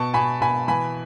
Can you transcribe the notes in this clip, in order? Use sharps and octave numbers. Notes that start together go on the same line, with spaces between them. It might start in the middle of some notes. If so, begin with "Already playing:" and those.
Already playing: B2 A5 C#6
B2 G#5 B5
B2 G#5 B5
E3 G#5 B5